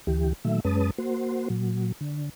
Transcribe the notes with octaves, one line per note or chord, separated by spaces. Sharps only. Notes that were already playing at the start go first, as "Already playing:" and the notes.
D2 E3 G4
A#2 D#3 F#3 A3 E5
F#2 G#3 C#4 B4 A5 D#6
A#3 F#4 C5
A#2 F#3
D3